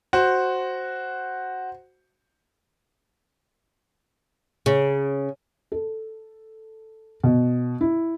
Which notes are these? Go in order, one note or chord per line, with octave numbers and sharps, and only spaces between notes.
F#4 C5
C#3
A4
B2
E4